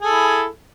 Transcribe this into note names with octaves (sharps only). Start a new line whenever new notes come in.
E4 G#4 A4